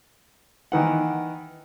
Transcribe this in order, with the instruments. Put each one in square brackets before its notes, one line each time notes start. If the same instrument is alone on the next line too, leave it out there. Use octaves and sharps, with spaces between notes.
[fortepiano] D#3 E3 F#5